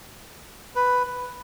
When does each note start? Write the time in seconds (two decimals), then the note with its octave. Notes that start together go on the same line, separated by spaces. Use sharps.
0.76 B4